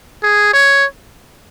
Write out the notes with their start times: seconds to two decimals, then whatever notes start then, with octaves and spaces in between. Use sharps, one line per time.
0.23 G#4
0.54 C#5